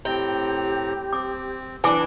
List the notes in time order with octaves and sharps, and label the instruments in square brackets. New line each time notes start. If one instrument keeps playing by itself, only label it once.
[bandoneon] A2 C4 A#5 [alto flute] G4 [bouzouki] G5
[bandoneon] C4 [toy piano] D6
[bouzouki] E3 D4 [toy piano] G#5 D6